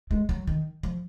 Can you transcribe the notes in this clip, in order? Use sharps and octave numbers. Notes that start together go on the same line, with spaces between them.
G#3
F#3
D#3
F3